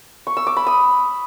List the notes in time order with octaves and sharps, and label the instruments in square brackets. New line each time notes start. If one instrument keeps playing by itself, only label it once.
[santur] C#6
E6
D6
B5
D#6